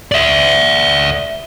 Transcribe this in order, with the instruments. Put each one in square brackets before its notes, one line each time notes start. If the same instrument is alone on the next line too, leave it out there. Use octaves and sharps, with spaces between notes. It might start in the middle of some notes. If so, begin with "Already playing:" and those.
[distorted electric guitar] D5 E5